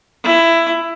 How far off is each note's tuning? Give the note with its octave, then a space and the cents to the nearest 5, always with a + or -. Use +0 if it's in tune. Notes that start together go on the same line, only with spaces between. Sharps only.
E4 +15